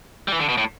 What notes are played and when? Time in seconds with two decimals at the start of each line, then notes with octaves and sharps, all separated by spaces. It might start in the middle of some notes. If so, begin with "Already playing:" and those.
0.28 G3
0.32 E3
0.40 D3
0.49 B2
0.58 A2